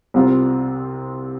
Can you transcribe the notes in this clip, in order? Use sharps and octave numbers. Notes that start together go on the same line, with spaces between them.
C2 C3 G3 C4 F4